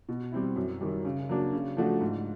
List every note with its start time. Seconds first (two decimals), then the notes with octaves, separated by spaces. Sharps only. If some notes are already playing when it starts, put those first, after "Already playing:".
0.09 B2
0.32 G3 C4 E4
0.56 F#2
0.80 D#3 G3
1.05 C#3
1.29 F#3 A#3 D4
1.53 C#3
1.77 F3 A3 D4 F#4
2.01 G#2